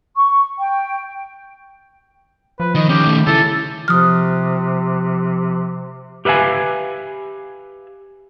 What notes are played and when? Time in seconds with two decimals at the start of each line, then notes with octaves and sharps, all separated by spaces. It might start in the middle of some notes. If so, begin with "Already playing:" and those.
0.16 C#6
0.59 G5
2.60 F3 B4
2.75 D#3 D#5
2.89 D#3 C#4 G4
3.07 A3
3.27 C#3 E3 E4 A4
3.88 C3 F3 D#6 F6 F#6
6.25 G4 B4 E5 F5 G#5